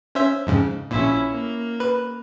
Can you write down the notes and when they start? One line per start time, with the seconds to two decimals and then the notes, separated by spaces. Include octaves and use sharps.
0.15 C#4 C5 E5
0.47 F2 G#2 C#3
0.91 A#1 A#2 C#4 E4
1.33 A#3
1.80 B4